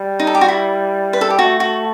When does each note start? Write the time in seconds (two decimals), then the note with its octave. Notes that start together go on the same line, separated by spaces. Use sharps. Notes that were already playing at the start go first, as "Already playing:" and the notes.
Already playing: G3
0.20 D#4
0.27 A4
0.35 G4
0.41 F#4
0.49 E4
1.13 B4
1.21 A4
1.30 G4
1.38 A3 F#4
1.60 F#4